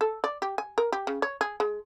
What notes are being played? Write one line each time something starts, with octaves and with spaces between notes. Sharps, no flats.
A4
D5
G4
G#5
A#4
G4
C#3
C#5
G#4
G#3